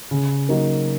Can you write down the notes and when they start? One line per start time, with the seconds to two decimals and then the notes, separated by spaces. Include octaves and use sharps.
0.11 C#3
0.49 F#3 A#3 D#4 F#4